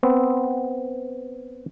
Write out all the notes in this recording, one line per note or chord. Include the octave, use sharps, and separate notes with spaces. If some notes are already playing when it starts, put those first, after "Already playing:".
B3 C4